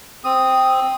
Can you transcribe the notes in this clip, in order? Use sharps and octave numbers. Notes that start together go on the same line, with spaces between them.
C4 D#6